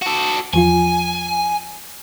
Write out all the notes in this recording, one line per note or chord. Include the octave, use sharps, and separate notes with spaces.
F#4 A4
E2 F3 F4 G#5